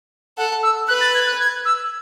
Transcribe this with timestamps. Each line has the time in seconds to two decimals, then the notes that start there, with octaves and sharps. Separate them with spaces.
0.38 A4 F#5
0.63 E6
0.88 B4 F#6
1.01 A6
1.15 G#6
1.27 F#6
1.40 G#6
1.65 E6